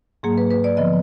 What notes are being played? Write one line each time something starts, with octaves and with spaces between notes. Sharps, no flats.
G#2 F#3 A#3 G#4
B4
B4
D5
D3 F3 B3 D#5